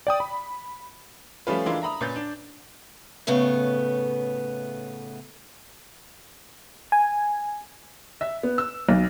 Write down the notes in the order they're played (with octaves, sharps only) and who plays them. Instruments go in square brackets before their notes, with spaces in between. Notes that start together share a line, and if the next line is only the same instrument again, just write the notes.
[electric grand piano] D5 G5 D#6
B5
[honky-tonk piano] F3 G3 A3 C#4 F4 B4
E3 G#3 D4 E4 F4 A#4
E5 A#5 B5 D#6
A#2 C#4 B4 G6 A6
D4
[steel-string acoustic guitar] A2 C#3 A3 B3
[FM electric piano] G#5
[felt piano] E5
B3
E6
B1